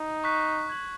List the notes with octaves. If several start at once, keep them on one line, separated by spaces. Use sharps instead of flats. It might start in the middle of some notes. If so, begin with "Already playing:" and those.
Already playing: D#4
C#6 F#6 B6
G#6 B6 F#7